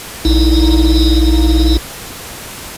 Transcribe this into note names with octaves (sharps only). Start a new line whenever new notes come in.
A#1 D#4 E4